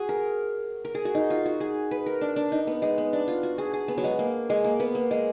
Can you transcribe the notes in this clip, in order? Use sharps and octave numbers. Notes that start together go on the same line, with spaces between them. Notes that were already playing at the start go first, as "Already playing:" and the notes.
Already playing: F#4 G#4
A#4
A#4
G#4
F#4
D#4
F4
F#4
G#4
B4
A#4
D4
D4
D#4
B3
G#3
B3
D4
F4
F#4
G#4
G#4
B3
F#3
G#3
A#3
G#3
A#3
B3
A#3
G#3